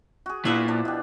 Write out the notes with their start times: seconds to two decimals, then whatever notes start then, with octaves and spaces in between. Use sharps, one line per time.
0.26 F#4 G#4
0.45 A#2 B3 D4 E4 G#4 E5 F5
0.68 F3 D4 D5
0.85 B2 G4